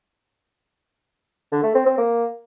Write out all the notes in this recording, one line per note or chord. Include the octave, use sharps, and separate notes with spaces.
D3
A3
C4
C4
A#3